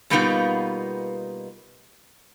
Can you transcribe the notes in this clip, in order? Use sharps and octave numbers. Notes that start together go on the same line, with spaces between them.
B2 G3 A#3 B3 D#4 F4